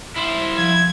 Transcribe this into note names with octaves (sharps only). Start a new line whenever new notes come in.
E4 C5
F3 G#6